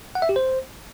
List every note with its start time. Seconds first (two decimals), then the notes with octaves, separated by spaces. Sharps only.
0.15 F#5
0.22 E5
0.29 G4
0.36 C5